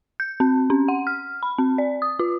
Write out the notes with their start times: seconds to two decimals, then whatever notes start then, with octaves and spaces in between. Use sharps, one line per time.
0.20 G6
0.40 C4
0.70 C#4
0.88 F#5
1.07 F6
1.43 B5
1.58 C4
1.78 D5
2.02 D#6
2.19 F4